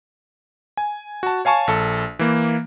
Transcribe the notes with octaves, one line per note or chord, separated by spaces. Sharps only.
G#5
F#4 A5
C#5 F5 G#5 A5 C#6
A#1 A4
E3 A#3